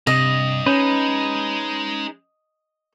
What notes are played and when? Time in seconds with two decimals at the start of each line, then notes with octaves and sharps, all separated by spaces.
0.07 G2 C3 D#5
0.67 G#3 C#4 D#4 B4 G6